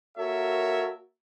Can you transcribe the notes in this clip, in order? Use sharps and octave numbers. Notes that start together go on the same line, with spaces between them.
A#3 F#4 A4 A#4 C#5 E5